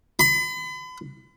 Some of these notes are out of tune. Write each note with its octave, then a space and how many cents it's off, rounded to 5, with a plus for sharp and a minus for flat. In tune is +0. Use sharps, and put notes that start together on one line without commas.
B5 +40